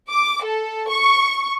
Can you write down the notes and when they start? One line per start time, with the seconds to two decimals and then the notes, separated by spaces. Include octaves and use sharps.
0.10 D6
0.44 A4
0.90 C#6